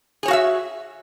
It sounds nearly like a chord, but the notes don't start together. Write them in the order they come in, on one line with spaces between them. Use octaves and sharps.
G#4 C#5 F#4 F5 E5